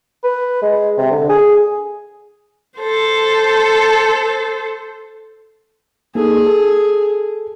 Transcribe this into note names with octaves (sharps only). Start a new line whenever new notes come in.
B4
G#3
C3
D3
G#4
A4 C5
A#3 D#4 G#4 A4
A4